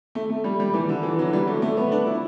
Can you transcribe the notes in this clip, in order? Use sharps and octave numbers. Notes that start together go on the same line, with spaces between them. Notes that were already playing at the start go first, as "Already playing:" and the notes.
A3
A3
G3
G3
E3
D3
E3
F#3
G3
A3
A3
B3
D4
E4